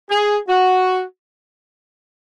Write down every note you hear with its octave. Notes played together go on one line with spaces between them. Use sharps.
G#4
F#4